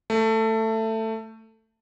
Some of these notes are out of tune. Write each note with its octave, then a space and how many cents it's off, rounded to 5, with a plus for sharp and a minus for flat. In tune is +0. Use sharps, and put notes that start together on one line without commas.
A3 +15